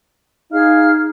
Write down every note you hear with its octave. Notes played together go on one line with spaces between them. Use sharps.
D#4 G#4 F5 F6